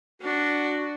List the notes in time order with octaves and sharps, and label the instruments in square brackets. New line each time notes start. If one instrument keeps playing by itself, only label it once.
[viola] D4 [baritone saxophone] F#4